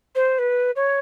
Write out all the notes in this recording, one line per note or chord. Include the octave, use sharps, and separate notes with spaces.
C5
B4
C#5